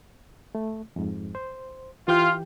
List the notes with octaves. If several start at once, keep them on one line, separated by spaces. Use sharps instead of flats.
A3
F2 G#2
C5
E3 F4 G4 G5